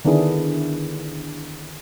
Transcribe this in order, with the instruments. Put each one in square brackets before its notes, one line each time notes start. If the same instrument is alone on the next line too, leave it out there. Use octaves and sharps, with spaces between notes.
[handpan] D3 D#3 B3 D4 E4 G#4